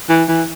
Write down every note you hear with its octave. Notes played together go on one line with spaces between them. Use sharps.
E3
E3